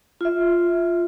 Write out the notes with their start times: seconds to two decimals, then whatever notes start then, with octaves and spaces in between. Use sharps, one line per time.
0.21 F4 E5